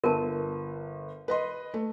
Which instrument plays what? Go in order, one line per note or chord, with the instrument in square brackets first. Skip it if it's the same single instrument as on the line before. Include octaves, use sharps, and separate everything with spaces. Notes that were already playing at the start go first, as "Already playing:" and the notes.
[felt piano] G1 [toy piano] A#4 A5
[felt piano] B4 D#5 C6
A3